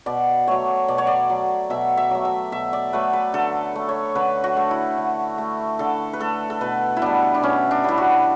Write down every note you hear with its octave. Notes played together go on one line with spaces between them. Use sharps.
B2 D5
F#3 A3 C#5
B2 D5
C#5
D5
F#3 A3
B2 E5
E5
F#3 A3
E5
B2 E5
D5
F#3 A3 B4
B4
D3 A4
A3
C#5
D3 B4
F#4
A3
E4
D3
A3
D3 A4
B4
A3 A4
A4
B2 B4
E4
G3 B3 D4
D4
B2 C#4
D4
G3 B3 E4
F#4